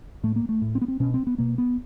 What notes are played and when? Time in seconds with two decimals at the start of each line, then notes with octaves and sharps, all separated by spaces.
0.23 A2 A3
0.36 A#3
0.49 A3
0.62 A2
0.75 C4
0.81 B3
0.88 C4
1.00 B2 C#4
1.14 C4
1.27 B3
1.38 B2 A#3
1.58 B3